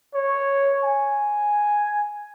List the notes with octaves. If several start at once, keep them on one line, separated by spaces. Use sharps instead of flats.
C#5
G#5